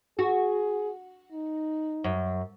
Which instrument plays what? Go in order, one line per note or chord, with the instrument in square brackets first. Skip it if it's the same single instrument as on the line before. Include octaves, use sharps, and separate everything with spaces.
[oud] F#4 [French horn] G#4
[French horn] D#4
[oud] F#2